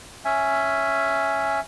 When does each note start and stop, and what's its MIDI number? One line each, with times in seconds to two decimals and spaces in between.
0.25 1.60 61
0.25 1.60 76
0.25 1.60 80